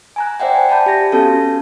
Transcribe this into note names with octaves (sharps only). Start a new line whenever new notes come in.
G#5 A#5 F#6
C5 D5 E5 F#5 G5
G#5
D5 A5 B5 G6
G4 A#6
B3 C#4 F#4 A4 A5